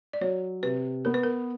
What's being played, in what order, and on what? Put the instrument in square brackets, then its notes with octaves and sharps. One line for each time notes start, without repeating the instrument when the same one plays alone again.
[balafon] D5
[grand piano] F#3 [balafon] C#5
[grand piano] C3 [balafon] B4
[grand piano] B3 [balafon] A#4
[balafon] B4
A#4